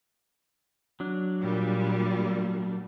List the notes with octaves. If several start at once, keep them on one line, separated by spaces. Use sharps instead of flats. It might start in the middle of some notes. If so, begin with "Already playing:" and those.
F#3 D4
A#2 G3